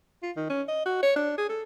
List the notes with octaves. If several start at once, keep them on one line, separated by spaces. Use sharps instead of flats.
F4
D#3
C#4
D#5
F#4
C#5
D4
G#4
A4